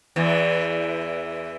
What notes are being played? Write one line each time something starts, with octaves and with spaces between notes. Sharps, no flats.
E2 E3